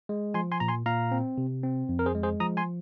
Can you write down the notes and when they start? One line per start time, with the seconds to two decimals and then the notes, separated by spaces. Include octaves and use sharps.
0.09 G#3
0.34 F3 G#5 C6
0.52 G#5 C6
0.60 A#2 A#5
0.68 G#5 C6
0.86 A#2 F5 A#5
1.12 C4
1.38 C3
1.63 C4
1.89 F2
1.99 A#4
2.06 G#4 C5
2.15 G#3
2.23 G#4 C5
2.40 F3 A#5 D#6
2.57 G#5 C6